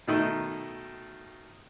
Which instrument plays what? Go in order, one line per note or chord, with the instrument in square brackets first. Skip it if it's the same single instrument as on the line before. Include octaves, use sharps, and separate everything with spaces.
[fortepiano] B2 D#3 A3 D#4